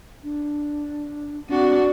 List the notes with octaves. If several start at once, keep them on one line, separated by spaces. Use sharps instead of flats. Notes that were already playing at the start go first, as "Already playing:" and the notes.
D4
C4 D4 F#4